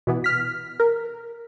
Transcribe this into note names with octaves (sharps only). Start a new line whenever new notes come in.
B2 E3 B3
F6 B6
A#4